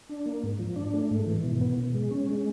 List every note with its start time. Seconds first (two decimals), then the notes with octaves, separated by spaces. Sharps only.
0.09 D4
0.26 A#3
0.43 G#2
0.60 F3
0.76 D4
0.93 A3
1.11 G#2
1.27 E3
1.44 B2
1.61 B3
1.78 B2
1.94 G#3
2.11 C#4
2.29 G#3